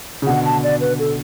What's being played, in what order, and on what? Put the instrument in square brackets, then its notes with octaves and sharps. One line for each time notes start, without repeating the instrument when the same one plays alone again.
[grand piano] C#3
[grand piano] B2 D3 [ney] F#5
[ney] A5
D5
B4
A4